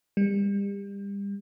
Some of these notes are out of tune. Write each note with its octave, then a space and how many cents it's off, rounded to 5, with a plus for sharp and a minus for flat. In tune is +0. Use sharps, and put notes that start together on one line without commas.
G3 +35